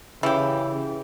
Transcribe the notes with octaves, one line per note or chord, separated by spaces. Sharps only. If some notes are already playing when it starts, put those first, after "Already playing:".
C#3 E3 G4